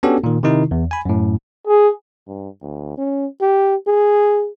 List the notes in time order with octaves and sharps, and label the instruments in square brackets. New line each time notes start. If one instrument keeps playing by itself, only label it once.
[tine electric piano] B3 C#4 D4 F#4 G4 A4
A#2 D#3
C3 D#3 D#4 E4
E2
G#5 B5
F#2 A2
[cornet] G#4
[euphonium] G2
D2
C#4
G4
G#4